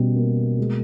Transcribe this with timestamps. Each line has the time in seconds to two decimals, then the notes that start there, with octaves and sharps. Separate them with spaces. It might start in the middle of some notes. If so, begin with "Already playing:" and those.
Already playing: B2 G3 C#4
0.16 A#3
0.59 G#3